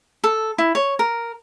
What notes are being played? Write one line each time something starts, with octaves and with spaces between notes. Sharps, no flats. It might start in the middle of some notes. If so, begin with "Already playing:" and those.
A4
E4
C#5
A#4